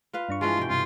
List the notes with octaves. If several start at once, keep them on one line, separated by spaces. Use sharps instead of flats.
F4 B4 F5
G2 D4 C#6
E3 F3 G#3 F4
B2 G5
G2 C3 F4